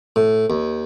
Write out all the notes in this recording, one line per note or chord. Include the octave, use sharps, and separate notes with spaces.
A2
D#2